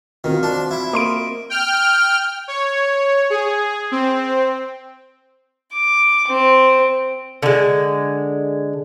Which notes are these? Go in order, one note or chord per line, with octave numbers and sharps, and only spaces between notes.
D#3 C4 F4 F#4
D4
E4
A#3 A#4 D#5 C6 D7
G5 F6
C#5
G#4
C4
D6
C4
D3 G#3